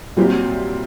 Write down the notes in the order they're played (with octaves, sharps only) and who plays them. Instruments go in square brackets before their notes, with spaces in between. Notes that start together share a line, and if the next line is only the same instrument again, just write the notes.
[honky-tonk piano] A#2 G3 C4 E4 G4 [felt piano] F#3